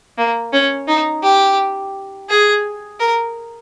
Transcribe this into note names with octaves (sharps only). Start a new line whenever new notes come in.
A#3
C#4
D#4
G4
G#4
A#4